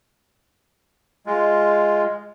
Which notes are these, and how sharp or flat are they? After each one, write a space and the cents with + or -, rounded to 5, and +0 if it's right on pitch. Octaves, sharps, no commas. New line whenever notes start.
G#3 +0 F4 +0